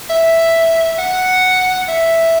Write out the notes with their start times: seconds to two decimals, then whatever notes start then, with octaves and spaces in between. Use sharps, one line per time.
0.10 E5
0.99 F#5
1.88 E5